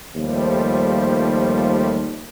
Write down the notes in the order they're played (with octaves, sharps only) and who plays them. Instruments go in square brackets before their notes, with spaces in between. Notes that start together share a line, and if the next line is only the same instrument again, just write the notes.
[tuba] D#2 [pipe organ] F3 G3 A3